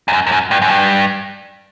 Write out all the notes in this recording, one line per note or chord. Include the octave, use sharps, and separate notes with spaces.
E2
F#2
E2
F#2
G2
F#2
G2